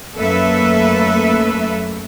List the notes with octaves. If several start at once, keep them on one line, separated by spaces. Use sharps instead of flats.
F#2 A3 A#3 A4 B4 E5